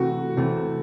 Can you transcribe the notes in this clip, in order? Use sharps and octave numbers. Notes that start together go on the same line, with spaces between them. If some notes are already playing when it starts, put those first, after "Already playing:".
Already playing: C3 E3 A3 F#4
C3 E3 A3